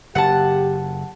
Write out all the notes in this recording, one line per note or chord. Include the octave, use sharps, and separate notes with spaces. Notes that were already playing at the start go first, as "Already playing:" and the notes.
F#1 G4 F#5 A5